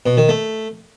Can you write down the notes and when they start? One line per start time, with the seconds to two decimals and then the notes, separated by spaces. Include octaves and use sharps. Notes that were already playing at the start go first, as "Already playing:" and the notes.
0.06 B2
0.17 D#3
0.29 A3